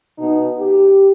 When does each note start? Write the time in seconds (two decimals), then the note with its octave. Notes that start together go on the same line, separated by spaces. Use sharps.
0.19 B2 B3 D#4
0.59 G4